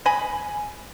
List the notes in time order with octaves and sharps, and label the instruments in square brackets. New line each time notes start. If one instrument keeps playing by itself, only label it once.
[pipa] D#5 G#5 B5